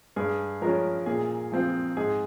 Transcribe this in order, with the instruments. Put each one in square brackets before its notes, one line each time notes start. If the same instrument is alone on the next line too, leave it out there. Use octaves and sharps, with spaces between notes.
[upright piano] G2 [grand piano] G#4
[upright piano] F3 G#3 C#4 [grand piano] A#4
[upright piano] A#2 [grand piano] G#4
[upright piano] F3 C4 F4
[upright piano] G#2 [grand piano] G#4